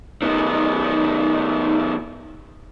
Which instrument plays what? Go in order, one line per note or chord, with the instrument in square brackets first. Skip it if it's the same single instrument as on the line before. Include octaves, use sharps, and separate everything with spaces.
[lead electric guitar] D#3 B3 [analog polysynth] D#4